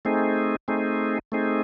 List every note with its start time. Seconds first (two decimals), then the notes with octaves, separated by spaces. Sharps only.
0.05 A3 C4 D#4 G#4
0.68 A3 C4 D#4 G#4
1.32 A3 C4 D#4 G#4